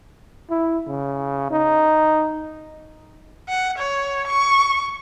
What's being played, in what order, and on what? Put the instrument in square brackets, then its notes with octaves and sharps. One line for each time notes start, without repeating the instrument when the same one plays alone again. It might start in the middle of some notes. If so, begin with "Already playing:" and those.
[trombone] E4
C#3
D#4
[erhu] F#5
C#5
C#6